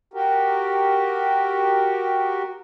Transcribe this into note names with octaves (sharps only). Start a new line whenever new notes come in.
F#4 G4 A#4